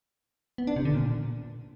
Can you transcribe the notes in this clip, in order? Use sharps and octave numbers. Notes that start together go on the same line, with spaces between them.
B3
D4
C3
D3
A#2